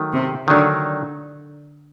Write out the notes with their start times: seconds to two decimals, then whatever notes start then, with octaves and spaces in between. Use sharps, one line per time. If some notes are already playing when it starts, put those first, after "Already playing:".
Already playing: D#3 F#3 A3
0.13 C3
0.48 D3 D#3 F#3 A3